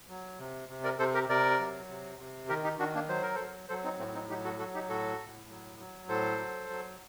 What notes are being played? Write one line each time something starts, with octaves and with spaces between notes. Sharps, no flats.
F#3
C3
C3
A#4 D5
C3 A4 C5
G4 A#4
C3 A#4 D5
F#3
C3
C3
D#3 G4 A#4
D#4 G4
D#3 D4 F#4
A#3 D4
F#3 C5
A#4
F#3 A4 C5
F#3 A4 C5
C4 D#4
A2 A3 C4
C4 D#4
F#3 D#4 G4
F#4 A4
F#3 F#4 A4
D#4 G4
A2 F#4 A4
A2
F#3
F#3
A2 A4 C5
F#3
F#3